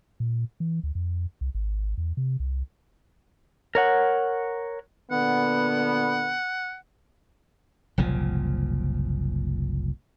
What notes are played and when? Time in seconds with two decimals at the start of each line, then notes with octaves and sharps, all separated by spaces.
0.20 A#2
0.60 E3
0.83 D2
0.95 F2
1.41 C2
1.55 G#1
1.98 E2
2.17 C3
2.40 C2
3.75 A#4 C#5 F#5
5.11 A#2 D3 B3 F#5
7.98 F#1 C2 A#2 F3